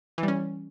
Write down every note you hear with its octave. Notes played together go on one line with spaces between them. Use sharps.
E3
G3
C#4